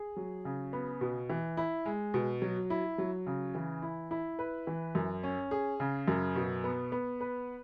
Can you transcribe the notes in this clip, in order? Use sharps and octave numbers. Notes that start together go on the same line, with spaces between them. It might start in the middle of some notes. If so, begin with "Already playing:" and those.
Already playing: G#4
F#3
C#3
B3
B2
E3
E4
G#3
B2
F#3
E4
F#3
C#3
E3
E4
E4
B4
E3
F#2
C#4
G#4
C#3
F#2
B2
B3
B3
B4